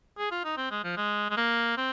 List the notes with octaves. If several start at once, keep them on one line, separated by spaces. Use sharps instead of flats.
G#4
F4
D#4
C4
G#3
F3
G#3
G#3
A#3
C4